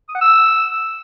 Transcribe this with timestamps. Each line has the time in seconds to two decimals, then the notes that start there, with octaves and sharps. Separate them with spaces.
0.09 D#6
0.15 F#5
0.21 E6